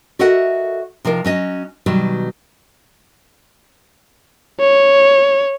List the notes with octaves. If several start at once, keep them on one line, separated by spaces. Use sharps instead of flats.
F#4 A4 A#4 D#5 E5 F#5
C3 F3 D#4 A#4
F#3 C#4 D#5
B2 D#3 F#3 G3
C#5